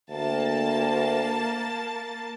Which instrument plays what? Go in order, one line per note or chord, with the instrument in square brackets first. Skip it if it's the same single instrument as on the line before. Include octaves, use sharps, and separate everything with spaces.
[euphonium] D2 [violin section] A#3 A5